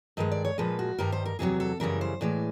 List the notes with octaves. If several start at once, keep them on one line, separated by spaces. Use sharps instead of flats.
G2 D#3 G#3 D#5
D5
C#5
A#2 F3 G#3 B4
F#4
G2 D#3 G3 A#4
C5
A#4
E2 C3 D#3 F#3 G#4
A4
F#2 C#3 E3 G3 A#4
C5
A2 E3 G#3 D5